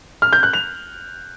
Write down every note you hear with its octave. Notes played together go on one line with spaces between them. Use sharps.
F6
G6
F#6
F7